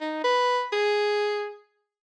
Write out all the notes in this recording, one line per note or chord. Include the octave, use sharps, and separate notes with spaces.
D#4
B4
G#4